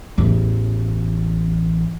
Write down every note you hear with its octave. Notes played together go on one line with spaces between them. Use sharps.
A1 E2